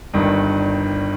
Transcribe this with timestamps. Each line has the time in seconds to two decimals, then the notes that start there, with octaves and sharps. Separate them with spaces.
0.14 G1 G2 D#3